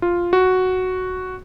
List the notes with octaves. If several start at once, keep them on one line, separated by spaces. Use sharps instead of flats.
F4
F#4